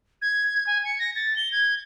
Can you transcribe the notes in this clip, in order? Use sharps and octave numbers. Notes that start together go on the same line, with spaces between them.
G#6
G#5
C#7
A#6
A6
G7
G#6